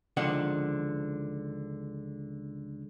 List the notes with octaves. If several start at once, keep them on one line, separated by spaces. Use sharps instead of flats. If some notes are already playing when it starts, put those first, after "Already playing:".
C#2 D3 D#3 F3 F5 F#5